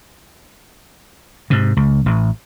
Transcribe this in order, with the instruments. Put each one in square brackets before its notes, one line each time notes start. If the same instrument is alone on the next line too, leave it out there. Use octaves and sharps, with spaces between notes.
[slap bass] G#2 C3
C#2
A1